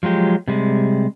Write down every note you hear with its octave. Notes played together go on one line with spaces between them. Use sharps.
F3 F#3 G#3 G4
C3 G3 G#3